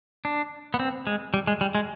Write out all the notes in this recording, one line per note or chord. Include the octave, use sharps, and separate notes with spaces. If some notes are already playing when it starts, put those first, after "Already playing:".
D4
B3
C4
G#3
G3
G#3
G3
G#3